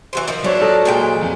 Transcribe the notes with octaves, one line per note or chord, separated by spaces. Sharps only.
E3 F#3 C5
D#3 F3
F#3 D4 C5 C#5 E5
F4 A4 D#5
A#2 G#3 G5
F2 F3